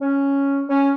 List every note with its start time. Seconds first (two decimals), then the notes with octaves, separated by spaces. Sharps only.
0.01 C#4
0.69 C#4